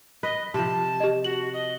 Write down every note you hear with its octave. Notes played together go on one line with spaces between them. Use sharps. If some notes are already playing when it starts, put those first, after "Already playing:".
B4 D#5
C3 F3 A5
G4 D#5
F#4 F#7
D#5